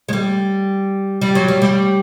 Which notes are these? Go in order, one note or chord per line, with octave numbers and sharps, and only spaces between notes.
G#3
G3
G3
F#3
G3
G3